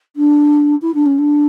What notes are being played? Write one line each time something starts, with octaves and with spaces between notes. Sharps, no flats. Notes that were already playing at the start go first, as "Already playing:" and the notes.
D4
E4
D4
C#4
D4